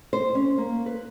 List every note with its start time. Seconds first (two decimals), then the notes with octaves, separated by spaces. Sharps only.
0.13 C5
0.35 C#4
0.58 A#3
0.86 B4